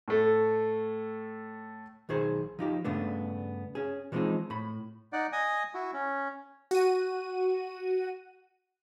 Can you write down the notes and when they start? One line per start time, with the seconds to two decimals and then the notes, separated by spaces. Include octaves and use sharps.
0.08 A2 A3
2.09 B1 D#3 G#4 C5
2.59 F3 D#4 G4
2.84 G2 C#3 A3 B3 D4
3.75 C#4 G#4
4.12 E3 F3 G#3 B3 C4 D#4
4.50 A2 B5
5.13 D#4 D5 F#5
5.32 D#5 G#5 D#6
5.74 E4 F#4
5.93 C#4
6.71 F#4 D#7